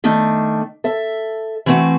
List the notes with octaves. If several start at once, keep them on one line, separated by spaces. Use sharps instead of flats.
D#3 A3 D4
A4 E5
E3 A3 C4 F#4